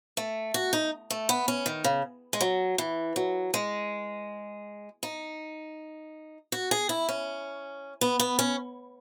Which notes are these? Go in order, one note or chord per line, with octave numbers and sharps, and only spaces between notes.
A3
F#4
D#4
A3
B3
C#4
D#3
C#3
G#3
F#3
E3
F#3
G#3
D#4
F#4
G#4
E4
C#4
B3
B3
C#4